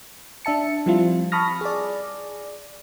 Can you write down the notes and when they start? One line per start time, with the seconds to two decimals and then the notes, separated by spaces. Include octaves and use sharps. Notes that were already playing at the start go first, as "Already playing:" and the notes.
0.45 D4 E5 A5 C#7
0.86 F3 G3 C4 E4 F4
1.32 A5 B5 C#6 D#6 F6 A#6
1.61 G#4 D5